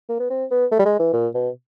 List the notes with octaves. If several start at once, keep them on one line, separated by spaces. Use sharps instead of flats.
A#3
B3
C4
B3
A3
G3
G#3
E3
A#2
B2